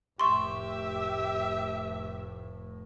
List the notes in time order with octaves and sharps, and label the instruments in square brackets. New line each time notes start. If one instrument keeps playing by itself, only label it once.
[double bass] F1 A2 [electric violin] G4 E5 [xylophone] C6 C#6